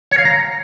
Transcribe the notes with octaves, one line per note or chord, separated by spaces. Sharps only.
C#5
F5
A#5